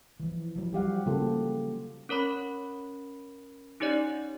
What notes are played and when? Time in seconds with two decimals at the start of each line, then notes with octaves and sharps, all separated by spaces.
0.20 E3 F3
0.56 F3 F#3
0.73 G3 G4 F5 F#5
1.06 C#3 A#3 F4 G4 A4
2.09 C#4 A#4 C#5 B5
3.80 C#4 D#4 G4 C#5 D5